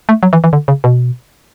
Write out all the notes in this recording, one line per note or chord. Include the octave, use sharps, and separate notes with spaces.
A3
F#3
E3
E3
D3
C#3
B2